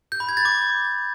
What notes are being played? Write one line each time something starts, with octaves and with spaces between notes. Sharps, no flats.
G6
B5
G#6
A6
D6